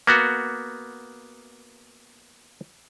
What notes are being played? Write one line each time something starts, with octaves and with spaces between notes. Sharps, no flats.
A#3 B3 F#4